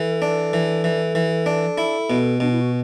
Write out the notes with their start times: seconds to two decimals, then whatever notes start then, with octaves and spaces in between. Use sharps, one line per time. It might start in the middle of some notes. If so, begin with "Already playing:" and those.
Already playing: E3 A4
0.22 D4
0.53 E3
0.84 E3
1.15 E3
1.46 D4
1.78 E4
2.10 B2
2.40 B2 D4
2.52 E4
2.61 F#4